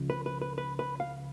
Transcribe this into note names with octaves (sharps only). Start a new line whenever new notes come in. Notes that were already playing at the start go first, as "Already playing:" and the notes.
Already playing: C#2 C#3 F3
B4
B4
B4
B4
B4
F5